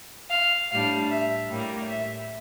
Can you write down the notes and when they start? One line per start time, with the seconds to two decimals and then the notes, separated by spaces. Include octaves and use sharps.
0.30 F5
0.70 A2 G3 D4 F5
1.09 E5
1.49 A2 G3 A#3
1.89 E5